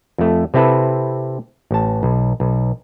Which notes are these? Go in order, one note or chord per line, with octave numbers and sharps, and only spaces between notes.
F2 A3
C3 C4 E4 A4 B4
A1 A5
B1
B1